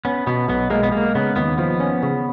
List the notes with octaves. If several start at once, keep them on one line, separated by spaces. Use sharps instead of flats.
B3 C#4
B2 B3
B1 B3
G#3 A#3
B3
G#3 A#3
C#3 B3
D#2 B3
F3 B3
C#4
C#3